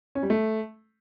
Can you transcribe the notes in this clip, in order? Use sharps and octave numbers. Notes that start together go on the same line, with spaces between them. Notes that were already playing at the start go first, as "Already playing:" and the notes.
C#4
G3
A3